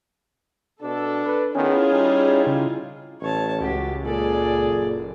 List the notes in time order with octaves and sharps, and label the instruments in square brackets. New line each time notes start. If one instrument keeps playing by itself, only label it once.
[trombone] B2 [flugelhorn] D4 [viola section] A4
[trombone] B4
[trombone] D#3 [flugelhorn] B3 [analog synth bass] C#4 [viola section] E4 F4 G#4
[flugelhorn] G3 [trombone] D#4
[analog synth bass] C#3
[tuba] A1 [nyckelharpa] C#5 A5
[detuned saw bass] C#2 [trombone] F#4 [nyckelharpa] G4
[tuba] A#2 [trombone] G#4 [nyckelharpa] A4 D5
[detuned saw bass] F#1